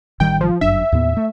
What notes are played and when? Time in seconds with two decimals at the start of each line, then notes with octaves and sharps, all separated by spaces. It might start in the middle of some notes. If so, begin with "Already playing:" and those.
0.20 A1 D#3 G3 G5
0.41 F3
0.61 G1 F#2 D4 E5
0.92 D#2 A2 B3
1.17 A3